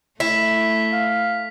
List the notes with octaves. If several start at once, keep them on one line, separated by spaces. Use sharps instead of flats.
A3 E4 B6
F5